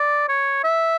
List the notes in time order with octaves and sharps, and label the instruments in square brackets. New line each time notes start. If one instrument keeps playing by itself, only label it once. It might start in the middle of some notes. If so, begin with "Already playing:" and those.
Already playing: [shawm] D5
C#5
E5